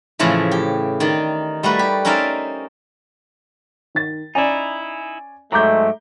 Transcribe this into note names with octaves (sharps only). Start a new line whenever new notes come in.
A2 C#3 E3 F3 A3
G4
D#3 D#4 D5
G3 A3 F#4 B4
G4
C#4 D#4 A#4 C5 D5 E5
D#3 A6
C#4 D#4 E4 D5 G#5
G#2 F#3 G#3 A3 A#5 D6 G6